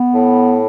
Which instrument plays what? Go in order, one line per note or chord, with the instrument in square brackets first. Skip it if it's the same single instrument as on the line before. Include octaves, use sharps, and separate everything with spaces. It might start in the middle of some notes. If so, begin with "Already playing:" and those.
Already playing: [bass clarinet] B3
[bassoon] A2